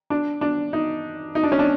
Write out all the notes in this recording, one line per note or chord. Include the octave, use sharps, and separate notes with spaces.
D4
D4
D#4
D#4
D4
C#4
D4